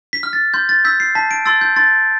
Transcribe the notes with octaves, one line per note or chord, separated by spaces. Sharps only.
B6
F6
A6
C6 G6
A6
E6 G6 B6
C7
A5 B6
D7
C6 E6 A6
G6
C6 A6